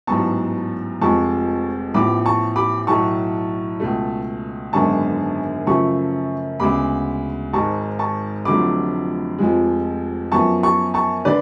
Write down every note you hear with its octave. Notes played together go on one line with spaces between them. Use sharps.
A1 G#2 F#3 B3 A5 C#6
F1 F2 F3 G#3 A5 C#6
A1 A2 F3 B3 B5 D6
A5 C#6
B5 D6
B1 A2 F#3 A3 A5 C#6
C#2 B2 A3
G#1 F#2 D3 G#3 B3 A5 C#6
F#2 C#3 F3 A3 A5 C#6
D2 C#3 G#3 B3 B5 D6
G#1 G#2 G#3 A5 C#6
A5 C#6
F1 F2 D3 F#3 A3 B5 D6
F1 F2 F3 G#3
F#2 F3 B3 A5 C#6
A5 C#6
A5 C#6
D3 B4 D5